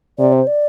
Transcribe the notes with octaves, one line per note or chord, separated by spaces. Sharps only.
C3 D5
C5
D5